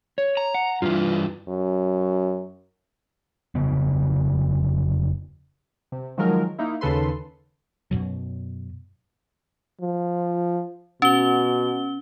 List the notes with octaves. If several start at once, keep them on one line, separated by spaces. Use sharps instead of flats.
C#5
A#5
F#5
G2 E3 F4
F#2
F1 C#3 B3
C3
D#3 F3 F#3 G#3 A#4
A#3 D#4 E4
D#2 C#3 A4 B4 C6
F#2 B2 F#3
F3
B2 C#4 G7